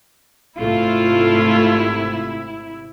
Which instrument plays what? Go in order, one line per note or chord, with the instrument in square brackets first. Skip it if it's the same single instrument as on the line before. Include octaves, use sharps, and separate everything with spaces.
[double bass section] G#1 C3 [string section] A3 [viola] E4 [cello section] F4